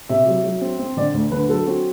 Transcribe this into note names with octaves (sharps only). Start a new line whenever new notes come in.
C3 E5
F#3
F#3
C4
C4
D3 D5
D2
D3 B4
F#3 A4
C4 F#4